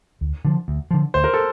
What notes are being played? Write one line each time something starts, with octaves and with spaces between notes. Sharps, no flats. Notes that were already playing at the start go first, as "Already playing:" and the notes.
D2
D3 F3
D2
D3 F3
D2 C5
A#4
A4